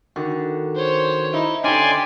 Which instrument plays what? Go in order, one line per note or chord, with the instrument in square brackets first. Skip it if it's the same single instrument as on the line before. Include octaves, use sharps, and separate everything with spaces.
[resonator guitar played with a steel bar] D3 [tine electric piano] D#3 F#4
[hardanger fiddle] C5 C#5
[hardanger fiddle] D#4 [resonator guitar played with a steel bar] E4
[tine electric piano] D3 C#4 [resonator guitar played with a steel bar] D#4 [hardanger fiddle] G4 [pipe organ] D5 G#5 C6